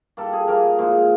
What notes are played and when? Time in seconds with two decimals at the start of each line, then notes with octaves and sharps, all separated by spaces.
0.17 A#2 G3 A#3 A4
0.33 G#4
0.48 A#2 F3 A#3 A#4
0.79 A#2 F3 G#3